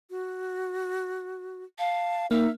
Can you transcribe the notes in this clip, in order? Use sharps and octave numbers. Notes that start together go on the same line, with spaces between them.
F#4
F5 A5
A#3 D#4 E5